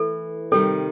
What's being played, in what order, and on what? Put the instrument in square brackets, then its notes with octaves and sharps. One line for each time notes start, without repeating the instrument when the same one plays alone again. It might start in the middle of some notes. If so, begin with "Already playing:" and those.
Already playing: [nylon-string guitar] E3 A3 E4 [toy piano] A4
[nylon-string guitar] C3 D#3 G3 C4 [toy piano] A4